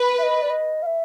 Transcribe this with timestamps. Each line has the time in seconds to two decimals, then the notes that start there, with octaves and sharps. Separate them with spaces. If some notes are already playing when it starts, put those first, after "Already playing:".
Already playing: B4
0.18 E5
0.23 D#5
0.42 D5
0.50 D#5
0.82 F5
0.86 E5